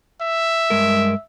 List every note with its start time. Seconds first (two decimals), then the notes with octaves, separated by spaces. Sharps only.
0.21 E5
0.70 G2 G#3 A#4